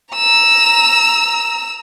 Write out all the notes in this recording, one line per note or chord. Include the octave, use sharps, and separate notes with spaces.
A#5 E6